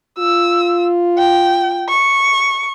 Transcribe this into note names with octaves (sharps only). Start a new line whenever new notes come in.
F4 E6
G5
C#6